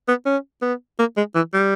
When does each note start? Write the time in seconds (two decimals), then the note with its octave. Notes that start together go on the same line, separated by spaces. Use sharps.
0.08 B3
0.26 C#4
0.62 B3
0.99 A#3
1.17 G#3
1.35 E3
1.53 G3